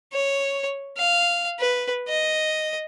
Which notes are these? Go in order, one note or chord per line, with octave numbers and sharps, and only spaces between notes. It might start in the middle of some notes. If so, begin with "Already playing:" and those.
C#5
F5
B4
D#5